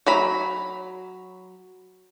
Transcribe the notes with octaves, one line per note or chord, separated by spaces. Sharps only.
F#3 A#5 B5